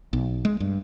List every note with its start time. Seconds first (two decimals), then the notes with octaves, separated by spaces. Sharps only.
0.13 B1
0.45 G#3
0.60 G2